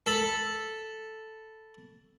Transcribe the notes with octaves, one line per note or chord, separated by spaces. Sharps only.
A4 B5